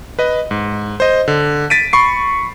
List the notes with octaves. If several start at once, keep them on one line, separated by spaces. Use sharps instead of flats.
B4 D#5
G#2
C5 D#5
D3
A6 B6 D7 D#7
B5 C#6 C7